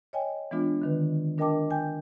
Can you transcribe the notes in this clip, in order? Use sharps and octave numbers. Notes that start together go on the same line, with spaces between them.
C#5 D#5 G5 G#5
E3 G#3 B3 D4 F4
D3 D#3 B4
D4 A#4 D#5 G5 A5 D6
G5 G#5 G6